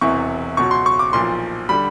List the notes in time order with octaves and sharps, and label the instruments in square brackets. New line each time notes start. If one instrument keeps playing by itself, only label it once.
[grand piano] E1 E2 C3 E3 C#6
C#2 B2 F#3 C#6
C6
C#6
D6
B1 A#2 F3 C6
D3 G3 B5